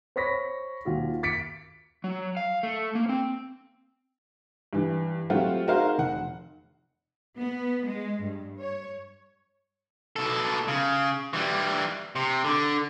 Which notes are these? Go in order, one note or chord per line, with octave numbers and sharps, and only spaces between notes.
C5 C#5 B5 C#6 A#6 B6
D#2 F4 F#4
A6 B6 C#7 D7
F#3
F5
A3
A#3
C4
G2 E3
F#3 G3 A3 C4 F4 F#5
D#4 F#4 G#4 A#4 C5 F5
F1 F#5
B3
G#3
G2
C#5
B2 A4
C#3
E3 G3
C3
D3